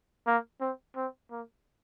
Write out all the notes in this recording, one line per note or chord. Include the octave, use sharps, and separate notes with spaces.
A#3
C4
C4
A#3